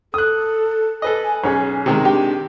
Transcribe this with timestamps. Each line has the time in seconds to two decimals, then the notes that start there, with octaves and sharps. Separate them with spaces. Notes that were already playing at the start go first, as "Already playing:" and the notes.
0.14 A4 D#6 F#6
1.02 A4 B4 D#5 G#5
1.44 B1 C#4 G#4 G#5
1.86 C3 D#3 G#3
2.05 D4 G4